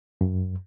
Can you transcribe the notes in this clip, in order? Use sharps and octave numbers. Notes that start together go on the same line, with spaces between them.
F#2